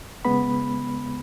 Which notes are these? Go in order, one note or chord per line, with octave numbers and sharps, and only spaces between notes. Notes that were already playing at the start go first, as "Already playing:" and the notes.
C#3 G#3 B3 B5